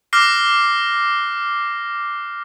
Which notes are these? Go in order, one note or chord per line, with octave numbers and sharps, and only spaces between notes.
D6 F6 F#6 A#6 C7